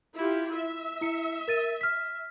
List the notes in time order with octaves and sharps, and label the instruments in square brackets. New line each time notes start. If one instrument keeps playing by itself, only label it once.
[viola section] E4 F4 G4
E5
[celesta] E4 C#7
A#4 A6 D#7
F6 B6